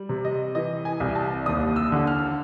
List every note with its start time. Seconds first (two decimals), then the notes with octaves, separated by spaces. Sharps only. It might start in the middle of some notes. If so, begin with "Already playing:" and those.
Already playing: G3
0.09 C3
0.25 D#5
0.55 E3 D#5
0.85 G#5
1.00 C2
1.15 A5
1.46 D#2 D#6
1.76 E6
1.92 D3
2.07 F6